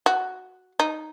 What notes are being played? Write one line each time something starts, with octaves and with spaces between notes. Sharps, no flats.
F#4
D#4